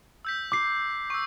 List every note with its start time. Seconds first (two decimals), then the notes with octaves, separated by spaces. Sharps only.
0.25 E6 G6 B6
0.52 D6 C7
1.10 C#6 E6